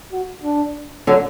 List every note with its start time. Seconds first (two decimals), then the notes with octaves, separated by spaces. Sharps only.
0.12 F#4
0.43 D4
1.07 D3 F#3